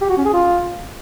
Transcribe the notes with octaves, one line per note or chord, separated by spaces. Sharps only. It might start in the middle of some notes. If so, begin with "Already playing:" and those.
G4
F#4
C#4
G#4
F4